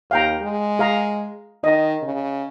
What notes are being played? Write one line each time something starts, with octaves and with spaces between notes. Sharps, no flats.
D#2 F5 G5 A#5
G#3
G#4 F5 A#5
D#3 D#5
C#3